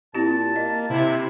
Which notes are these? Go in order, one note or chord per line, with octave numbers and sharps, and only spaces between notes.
A#2 C4 E4 G4 A5
A#3 D#5
C3 E4